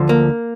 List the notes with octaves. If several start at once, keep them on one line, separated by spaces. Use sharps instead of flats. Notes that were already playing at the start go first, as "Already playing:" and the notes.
Already playing: D2 D3 F3
A#3